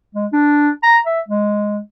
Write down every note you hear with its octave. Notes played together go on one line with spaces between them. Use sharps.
G#3
D4
A#5
E5
G#3